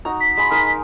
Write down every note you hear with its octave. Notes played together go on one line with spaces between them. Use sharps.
D#4 F#4 A#5
B6
G#3 G#5 B5
G#3 D#4 A#4